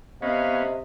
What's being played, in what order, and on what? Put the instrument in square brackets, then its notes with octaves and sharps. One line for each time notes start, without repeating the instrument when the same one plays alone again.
[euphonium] C3 [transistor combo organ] B3 C#4 [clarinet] D#5 [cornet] F5